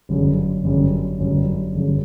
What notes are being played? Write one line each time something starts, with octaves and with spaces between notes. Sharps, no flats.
G1 F#2 C#3
G1 F#2 C#3
G1 F#2 C#3
G1 F#2 C#3